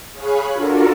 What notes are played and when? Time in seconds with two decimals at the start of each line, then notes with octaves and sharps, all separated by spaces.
0.13 G#4 C#5 F5 G#5 B5 F#6
0.51 D4 F4 F#4 A4 A#4